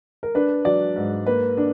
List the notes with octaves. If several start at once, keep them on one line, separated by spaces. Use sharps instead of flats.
A#4
D4 B4
F#3 D5
G#2
A#3 B4
D4